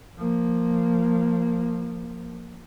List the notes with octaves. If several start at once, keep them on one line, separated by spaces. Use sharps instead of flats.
F3 A#3